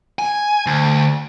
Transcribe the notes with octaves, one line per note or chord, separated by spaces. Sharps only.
G#5
D2